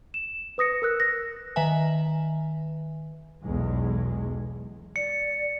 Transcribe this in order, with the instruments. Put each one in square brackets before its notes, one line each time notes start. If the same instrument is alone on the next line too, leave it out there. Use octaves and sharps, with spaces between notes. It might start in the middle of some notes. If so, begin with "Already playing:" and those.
[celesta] E7
B4 D#6 A#6 C#7
A#4 E6 F#6
A#6
[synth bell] D#3 B4 E5 G#5
[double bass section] B1 E2 G#3
[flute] D5 [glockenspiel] C#7